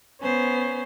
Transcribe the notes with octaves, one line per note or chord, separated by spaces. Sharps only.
B3 C#4 C5